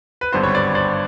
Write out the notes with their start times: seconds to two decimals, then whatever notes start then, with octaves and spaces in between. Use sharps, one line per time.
0.21 B4
0.33 G#1 G2 D3 G3 B3 C5
0.43 C#5
0.55 C5 D5
0.75 C5 D5